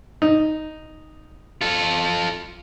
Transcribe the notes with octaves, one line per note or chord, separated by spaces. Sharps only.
D#4
F4 A4